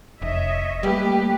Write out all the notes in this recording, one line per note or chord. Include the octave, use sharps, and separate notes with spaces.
F1 C#5 D#5 E5
G3 A3 A#3 G4 B4